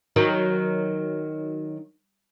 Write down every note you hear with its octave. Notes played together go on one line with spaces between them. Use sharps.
D#3 F#3 D#4